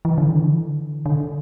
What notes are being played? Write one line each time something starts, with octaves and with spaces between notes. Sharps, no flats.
E3
D3
E3
D3
D3